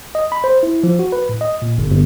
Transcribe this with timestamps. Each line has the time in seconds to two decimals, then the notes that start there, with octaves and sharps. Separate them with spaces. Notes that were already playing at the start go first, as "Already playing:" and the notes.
0.15 D#5
0.32 B5
0.44 C5
0.63 E4
0.84 F3
0.99 F#4
1.12 B4
1.29 A2
1.41 D#5
1.62 A#2
1.78 G1
1.91 G1